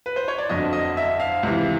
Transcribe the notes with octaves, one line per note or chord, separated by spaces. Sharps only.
B4
C5
C#5
D5
G1 F2 D3 F#3 D#5
D#5
E5
F5
C#2 C3 E3